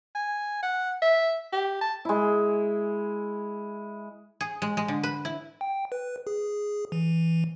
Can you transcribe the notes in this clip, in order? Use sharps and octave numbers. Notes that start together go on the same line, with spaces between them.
G#5
F#5
E5
G4
A5
G#3 E4
G#4
G#3
G#3
D3
B4
E4
G5
B4
G#4
E3